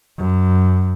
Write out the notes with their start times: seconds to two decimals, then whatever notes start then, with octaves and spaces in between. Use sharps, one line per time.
0.18 F#2